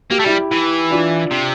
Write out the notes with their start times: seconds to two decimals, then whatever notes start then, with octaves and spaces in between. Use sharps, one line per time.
0.10 A#3 G4
0.19 A3
0.24 G3 E4 G4
0.52 E3
0.91 D4 F4
1.31 C3